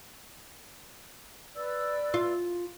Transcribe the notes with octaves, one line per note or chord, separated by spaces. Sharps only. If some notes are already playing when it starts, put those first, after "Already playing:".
B4 D5 E6
F4